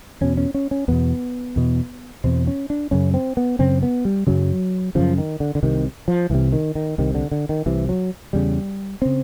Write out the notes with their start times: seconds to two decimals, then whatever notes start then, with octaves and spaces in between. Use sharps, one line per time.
0.21 E2 B2 C#4
0.37 C#4
0.54 C#4
0.71 C#4
0.88 E2 B2 B3
1.56 E2 B2
2.24 E2 B2 C4
2.47 C#4
2.70 D4
2.91 F#2 C#3 C#4
3.14 C4
3.37 B3
3.59 F#2 C#3 C4
3.83 B3
4.05 G3
4.27 F#2 C#3 F#3
4.95 F#2 C#3 F3
5.18 D#3
5.40 D3
5.55 D3
5.63 C2 C3 D#3
6.08 F3
6.30 C2 C3 E3
6.52 D#3
6.75 D#3
6.98 C2 C3 D#3
7.14 D3
7.31 D3
7.49 D#3
7.66 C2 C3 E3
7.89 F#3
8.33 E2 C#3 G3
9.02 C#3 C4